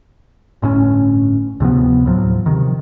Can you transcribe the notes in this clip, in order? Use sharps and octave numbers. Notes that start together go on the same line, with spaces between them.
G1 A2 D3 C#4
D2 C3 F3 B3
D#2 A2 F3 F#3
C3 D#3